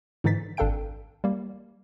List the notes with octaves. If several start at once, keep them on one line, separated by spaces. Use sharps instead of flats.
G#2 D3 E3 D#4 A6 B6
G#1 D4 A4 F5 G5 D7
G3 A#3